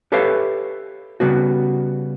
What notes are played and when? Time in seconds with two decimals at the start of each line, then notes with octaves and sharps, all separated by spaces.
0.12 G4 A4 B4 C#5 E5 F5
1.20 C#3 G3 B3 F#4